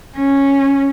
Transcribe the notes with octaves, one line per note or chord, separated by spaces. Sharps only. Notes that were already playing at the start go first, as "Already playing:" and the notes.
C#4